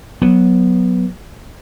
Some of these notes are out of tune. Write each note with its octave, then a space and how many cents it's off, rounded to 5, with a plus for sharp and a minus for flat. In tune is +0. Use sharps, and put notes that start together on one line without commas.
F#3 +0 B3 -10